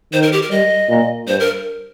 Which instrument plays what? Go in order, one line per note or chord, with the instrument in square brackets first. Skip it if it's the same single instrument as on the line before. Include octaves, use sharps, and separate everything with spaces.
[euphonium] D#3 [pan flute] C5
[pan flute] A#4
G4
A#4
[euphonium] G3 [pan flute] D#5
[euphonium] A#2
[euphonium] G2 [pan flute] C5
[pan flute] A#4